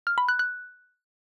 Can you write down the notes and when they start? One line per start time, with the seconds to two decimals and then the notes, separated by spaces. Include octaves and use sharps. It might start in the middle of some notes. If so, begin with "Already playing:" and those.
0.07 F6
0.18 B5
0.28 F#6
0.39 F#6